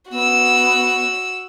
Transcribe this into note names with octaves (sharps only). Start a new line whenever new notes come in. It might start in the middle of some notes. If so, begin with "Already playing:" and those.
B3 F#4 E6